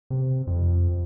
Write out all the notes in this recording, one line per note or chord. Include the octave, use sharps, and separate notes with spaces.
C3
F2